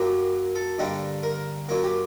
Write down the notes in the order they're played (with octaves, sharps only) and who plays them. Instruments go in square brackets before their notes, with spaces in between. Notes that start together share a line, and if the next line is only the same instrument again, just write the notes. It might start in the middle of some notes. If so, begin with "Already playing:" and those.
Already playing: [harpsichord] F#2 F#3 A#3 G4
A4
G2 D3 G3 A#3
A#4
F#2 F#3 A#3
G4